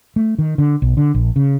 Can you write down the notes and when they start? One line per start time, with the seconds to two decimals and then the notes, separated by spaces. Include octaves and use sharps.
0.16 A3
0.38 D#3
0.58 D3
0.82 B1
0.97 D3
1.14 A#1
1.36 C#3